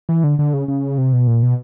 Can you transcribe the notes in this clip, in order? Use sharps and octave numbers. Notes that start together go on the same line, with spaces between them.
E3
D3
D3
C#3
C#3
C3
B2
A#2
B2